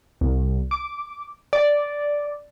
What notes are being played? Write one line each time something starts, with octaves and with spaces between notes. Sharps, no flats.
C2
D6
D5